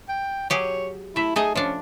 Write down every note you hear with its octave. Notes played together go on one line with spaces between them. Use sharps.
G5
F#3 G4 G#4 C#5
A3 E4 E5
A3 D#4 G#4 D#5
F3 C#4 D4